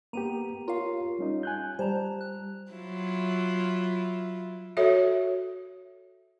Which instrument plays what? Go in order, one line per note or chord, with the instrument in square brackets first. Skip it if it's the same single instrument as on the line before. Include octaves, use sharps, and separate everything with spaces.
[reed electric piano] A#3 B3 G4 [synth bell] A#5 D#7
[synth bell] F4 G4 F5 [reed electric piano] A#4 C#5
[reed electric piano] G3 C#4 D#4
G#5 F#6 G6
[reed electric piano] G3 [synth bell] C5 A5 A#5
[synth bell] F#6
[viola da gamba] F#3 E4 F4
[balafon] F#4 A4 C#5 E5